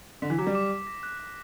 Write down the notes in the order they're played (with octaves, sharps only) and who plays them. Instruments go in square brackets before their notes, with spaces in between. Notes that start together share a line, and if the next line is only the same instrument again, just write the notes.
[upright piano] D3 [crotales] B6
[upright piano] E3
[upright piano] F#3 [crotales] D6
[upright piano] G3
[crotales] D6
D6
A#6
F#6
F#6